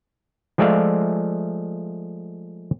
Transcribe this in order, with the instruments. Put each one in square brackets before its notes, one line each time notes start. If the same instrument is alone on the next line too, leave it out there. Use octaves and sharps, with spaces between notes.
[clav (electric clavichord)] F3 G#3 A3 D5 E5 F5